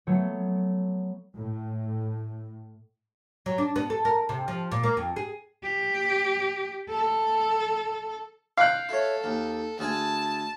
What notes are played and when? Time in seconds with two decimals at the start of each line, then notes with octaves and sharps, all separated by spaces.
0.07 F#3 A3 B3 C#5
1.35 A2
3.46 F#3
3.58 D4
3.76 B3
3.90 A4
4.05 A#4
4.29 C3
4.48 F3
4.72 A#2
4.83 A#3
4.97 F2
5.16 G#4
5.63 G4
6.89 A4
8.58 F5 G5 F#6
8.89 E4 A4 C#5
9.24 D#2
9.79 D2 G#4 G#5 A5